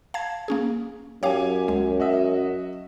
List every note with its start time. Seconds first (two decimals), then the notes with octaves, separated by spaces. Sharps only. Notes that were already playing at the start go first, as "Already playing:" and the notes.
0.14 F5 A5 G#6
0.48 A#3 C#4 G#4
1.23 F#2 G4 C#5 F5 G#5 D6
1.68 C#2 G#3
2.00 F#4 D#5 E5